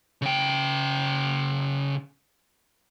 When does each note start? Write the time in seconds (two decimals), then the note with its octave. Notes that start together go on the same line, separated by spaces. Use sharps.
0.22 C#3 G5